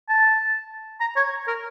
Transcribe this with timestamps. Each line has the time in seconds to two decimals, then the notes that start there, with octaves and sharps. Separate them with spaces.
0.09 A5
1.01 A#5
1.16 C#5
1.48 A#4